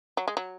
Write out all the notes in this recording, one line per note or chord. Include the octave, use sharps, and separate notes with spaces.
F#3
G#3
F#3